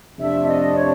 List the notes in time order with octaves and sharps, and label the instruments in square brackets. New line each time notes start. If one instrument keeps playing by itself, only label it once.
[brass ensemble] F2 C3 F3 A3 D4 [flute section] E5
[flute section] D#5
C#5